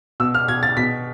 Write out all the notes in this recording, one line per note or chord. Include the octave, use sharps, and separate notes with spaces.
B2 E6
F6
B2 G#6
A6
B2 B6